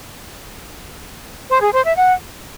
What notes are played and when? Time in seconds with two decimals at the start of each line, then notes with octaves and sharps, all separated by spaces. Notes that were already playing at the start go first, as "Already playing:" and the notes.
1.51 C5
1.62 G#4
1.73 C5
1.85 E5
1.96 F#5